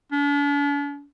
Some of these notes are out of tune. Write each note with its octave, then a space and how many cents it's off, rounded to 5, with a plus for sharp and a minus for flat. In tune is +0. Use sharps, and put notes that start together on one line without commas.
D4 -45